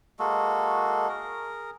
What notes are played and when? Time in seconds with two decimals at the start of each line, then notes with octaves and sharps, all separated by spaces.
0.19 G#3 A#3 F#4 A4
1.09 G#4 A#4